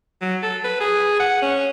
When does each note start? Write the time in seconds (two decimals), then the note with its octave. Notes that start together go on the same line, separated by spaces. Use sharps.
0.22 F#3
0.43 A4
0.64 B4
0.81 G#4
1.20 F#5
1.42 C#4